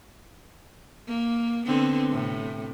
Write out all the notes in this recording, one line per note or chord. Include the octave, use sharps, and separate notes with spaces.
A#3
D3 B3 C4
A2 C3